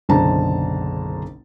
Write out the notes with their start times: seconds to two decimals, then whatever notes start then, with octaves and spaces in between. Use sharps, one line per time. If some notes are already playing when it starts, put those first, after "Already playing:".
0.09 F#1 B1 D3 C5 A5 A#5